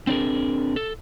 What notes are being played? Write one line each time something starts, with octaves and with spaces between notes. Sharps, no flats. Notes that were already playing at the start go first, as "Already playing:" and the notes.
C4 D4 G#4 A#4
A4